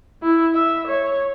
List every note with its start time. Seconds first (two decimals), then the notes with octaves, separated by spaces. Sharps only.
0.22 E4
0.53 E5
0.87 C#5